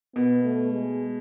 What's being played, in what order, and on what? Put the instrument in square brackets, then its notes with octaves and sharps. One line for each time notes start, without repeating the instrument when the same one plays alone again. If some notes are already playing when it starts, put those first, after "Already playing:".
[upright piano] B2 [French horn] B3
[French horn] A3
G#3